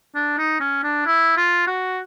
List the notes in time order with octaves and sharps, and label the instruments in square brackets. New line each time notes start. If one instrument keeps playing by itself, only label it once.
[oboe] D4
D#4
C#4
D4
E4
F4
F#4